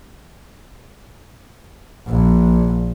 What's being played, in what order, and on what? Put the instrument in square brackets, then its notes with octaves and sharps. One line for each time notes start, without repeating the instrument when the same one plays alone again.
[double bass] A#1